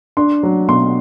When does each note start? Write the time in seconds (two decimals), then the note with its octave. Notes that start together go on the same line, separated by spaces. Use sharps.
0.17 D4 C6
0.43 F#3
0.68 B2 C6